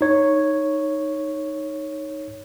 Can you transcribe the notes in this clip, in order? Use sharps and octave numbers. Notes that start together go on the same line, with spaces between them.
D#4 C#5